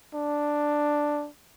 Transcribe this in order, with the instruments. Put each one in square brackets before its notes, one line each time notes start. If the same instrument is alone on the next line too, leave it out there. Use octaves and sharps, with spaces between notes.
[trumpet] D4